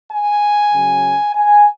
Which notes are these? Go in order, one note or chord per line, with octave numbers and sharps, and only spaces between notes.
G#5
C#3 F#3 C#4
G#5